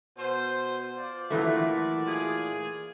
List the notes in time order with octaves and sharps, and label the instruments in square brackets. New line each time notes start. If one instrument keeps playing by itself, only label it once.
[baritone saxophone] B2 [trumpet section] C5
[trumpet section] F4 D5
[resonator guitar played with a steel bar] A#2 E3 A3 [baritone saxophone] F#3
[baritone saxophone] G#4